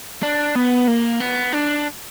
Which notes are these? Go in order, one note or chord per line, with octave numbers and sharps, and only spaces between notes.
D4
B3
A#3
B3
D4